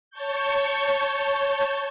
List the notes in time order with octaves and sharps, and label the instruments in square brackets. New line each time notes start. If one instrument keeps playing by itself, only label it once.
[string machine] C#5 A5 C#6 G6